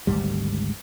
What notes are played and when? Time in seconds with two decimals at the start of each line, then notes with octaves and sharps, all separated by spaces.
0.07 G#1 D2 G#2 G3